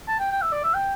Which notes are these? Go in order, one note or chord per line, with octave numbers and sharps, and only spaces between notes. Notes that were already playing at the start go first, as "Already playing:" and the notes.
A5
G5
G5
E5
D5
E5
G5